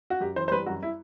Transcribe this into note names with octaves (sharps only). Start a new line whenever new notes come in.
F#4
F#2 G4
E3 C5
C5
G3 B4
F#2 F#4
E4